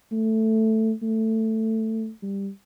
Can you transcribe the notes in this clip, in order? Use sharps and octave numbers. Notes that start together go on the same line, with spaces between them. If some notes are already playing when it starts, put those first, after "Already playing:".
A3
A3
G3